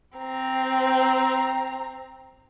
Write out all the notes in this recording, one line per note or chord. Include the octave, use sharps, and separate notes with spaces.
C4 A#5